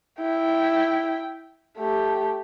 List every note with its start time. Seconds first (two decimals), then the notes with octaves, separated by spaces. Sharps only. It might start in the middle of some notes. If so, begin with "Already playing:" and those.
0.21 E4 G5
1.78 A3 G4